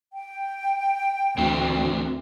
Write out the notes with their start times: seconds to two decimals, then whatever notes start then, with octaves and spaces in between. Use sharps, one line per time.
0.13 G5
1.38 D2 E3 C4 F#4